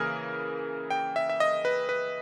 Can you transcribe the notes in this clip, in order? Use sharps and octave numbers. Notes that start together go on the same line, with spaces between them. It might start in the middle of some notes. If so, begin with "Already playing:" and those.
Already playing: C#3 E3 A#3 G#4 A#4
G5
E5
E5
D#5
B4
B4